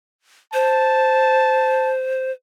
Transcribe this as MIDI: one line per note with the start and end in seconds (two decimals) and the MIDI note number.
0.54 2.31 72
0.54 1.92 81